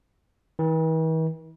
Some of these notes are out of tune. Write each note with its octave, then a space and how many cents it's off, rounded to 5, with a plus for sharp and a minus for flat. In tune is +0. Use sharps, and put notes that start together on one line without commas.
E3 -45